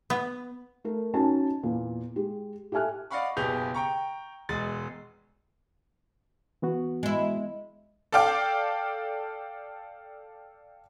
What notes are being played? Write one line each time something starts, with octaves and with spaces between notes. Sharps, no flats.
B3
A3 A#4
C#4 D#4 F#4 G#5 A5
E2 A#2
G#3 G4
G4 A4 E5 G#5 F6 F#6
D5 D#5 F5 F#5 B5 C#6
F#1 B2 G4 G#4 G6 F7
G5 A#5 C#6
E1 G#3 A6
E3 B3 F#4
G#3 E4
A4 D5 F5 G5 D6